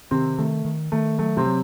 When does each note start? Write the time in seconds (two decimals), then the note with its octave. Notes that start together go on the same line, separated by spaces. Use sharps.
0.11 C3 D#3 C4
0.38 D#3 A3
0.65 D#3
0.92 D#3 A3
1.19 F#3 A3
1.37 C3 C4
1.46 F#3